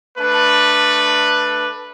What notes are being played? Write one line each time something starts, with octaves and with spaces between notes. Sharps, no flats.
A3 D4 B4